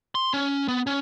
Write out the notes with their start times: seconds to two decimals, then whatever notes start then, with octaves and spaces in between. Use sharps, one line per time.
0.15 C6
0.34 C#4
0.68 B3
0.87 C#4